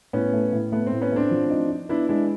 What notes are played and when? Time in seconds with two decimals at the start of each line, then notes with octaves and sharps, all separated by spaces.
0.13 A2 B3 C#4
0.33 A3
0.53 A2
0.72 A3 B3
0.87 C4
0.92 A2
1.01 B3 C#4
1.12 A3 C4 D4
1.31 F3
1.50 D#4
1.70 D#4
1.89 B3 D4 E4
2.09 G#3 D4 E4